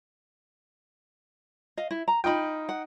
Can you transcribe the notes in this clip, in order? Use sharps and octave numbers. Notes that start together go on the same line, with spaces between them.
D#5 F5
E4
A#5
D#4 F4 G5 B5
F#5